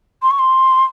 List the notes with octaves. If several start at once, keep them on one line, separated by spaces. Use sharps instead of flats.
C6
C#6
C6